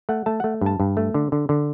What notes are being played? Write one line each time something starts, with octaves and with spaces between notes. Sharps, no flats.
A3 F#5
A3 A5
A3 F#5
G2 A5
G2
A3
D3
D3
D3